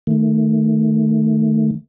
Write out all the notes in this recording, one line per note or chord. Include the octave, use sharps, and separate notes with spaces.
D#3 A3